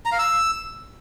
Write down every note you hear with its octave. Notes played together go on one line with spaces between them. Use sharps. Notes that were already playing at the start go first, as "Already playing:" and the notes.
A#5
F5
E6